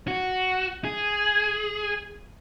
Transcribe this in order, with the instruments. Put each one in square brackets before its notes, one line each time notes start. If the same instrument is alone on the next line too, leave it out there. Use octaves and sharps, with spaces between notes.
[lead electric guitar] F#4
G#4